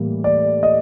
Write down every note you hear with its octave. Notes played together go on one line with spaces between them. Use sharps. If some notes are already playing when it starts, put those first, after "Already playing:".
Already playing: A2 E3 G3 A#3
D5
D#5